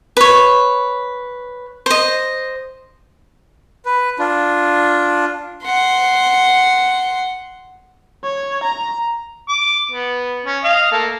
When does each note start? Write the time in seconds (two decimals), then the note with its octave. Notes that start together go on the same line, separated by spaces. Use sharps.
0.17 B4 C#5
1.86 C5 D#5
3.85 B4
4.19 D4 F4
5.65 F#5 C6
8.24 C#5
8.63 A#5
9.49 D6
9.91 B3
10.45 C#4
10.64 D#5 F5 D#6
10.91 A3 A#3